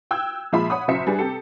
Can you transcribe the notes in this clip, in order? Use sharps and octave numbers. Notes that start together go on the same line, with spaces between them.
G5 E6 F#6 G#6
A#2 F3 G#3 F4 E5 B5
C#5 F#5 B5 D#6
F#1 F#2 F#4 E5 B6 C#7
G3 D4 G#4 B4
C3 G4 A4